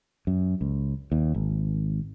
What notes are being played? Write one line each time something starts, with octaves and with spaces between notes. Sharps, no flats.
F#2
C#2
D#2
G#1